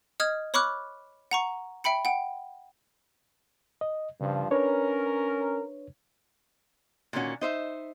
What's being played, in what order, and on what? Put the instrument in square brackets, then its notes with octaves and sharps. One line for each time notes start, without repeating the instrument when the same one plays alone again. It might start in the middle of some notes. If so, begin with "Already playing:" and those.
[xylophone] D#5 D#6 F6 G#6
C#5 B5 C#6 D6 F6 F#6
F#5 A#5 C#6
E5 G5 B5 C#7
F#5 G5
[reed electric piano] D#5
[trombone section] G2 F3 [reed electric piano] C#3
[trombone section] C#4 A#4 [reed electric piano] D4 B4 C#5
[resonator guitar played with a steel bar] A#2 D3 D#3 A#3 C#4 F#4
D#4 C5 E5